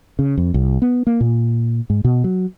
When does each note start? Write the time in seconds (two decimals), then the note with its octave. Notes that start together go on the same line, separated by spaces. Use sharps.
0.19 C#3
0.38 F2
0.54 C2
0.82 B3
1.07 A#3
1.21 A#2
1.90 G#2
2.04 B2
2.24 F#3